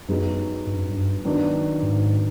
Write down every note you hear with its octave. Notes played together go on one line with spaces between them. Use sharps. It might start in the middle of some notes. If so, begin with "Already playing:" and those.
F#2 F#3 B3 D#4 G#4
G2
F#2
G2
D#3 F#3 B3 D4
G#2